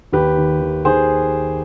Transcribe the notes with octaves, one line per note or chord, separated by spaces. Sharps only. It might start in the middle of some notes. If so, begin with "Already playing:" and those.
D#2 G4 B4
D#3
D#3
D#3 G#4 C5